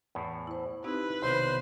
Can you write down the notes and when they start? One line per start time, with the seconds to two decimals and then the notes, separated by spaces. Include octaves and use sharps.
0.15 E2 A2
0.47 E4 C5
0.84 C4 D#4 E4 G4 B4
1.22 B1 C3 D#3 B3 C5 C6